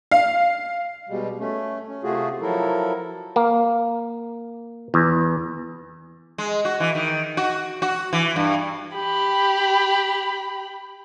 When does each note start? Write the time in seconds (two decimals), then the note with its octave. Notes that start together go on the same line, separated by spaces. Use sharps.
0.11 F5
1.09 B2 G3 G#3
1.39 A3 C#4
1.88 C#4
2.03 C3 A3 F4 F#4 G#4
2.41 F3 F#3 E4 A4 A#4
3.36 A#3
4.94 E2
6.38 G#3
6.65 F#4
6.80 E3
6.95 D#3
7.37 F#4
7.82 F#4
8.13 E3
8.36 G2
8.95 G4 B5